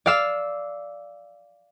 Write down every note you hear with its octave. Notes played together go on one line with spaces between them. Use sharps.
D5 F5 E6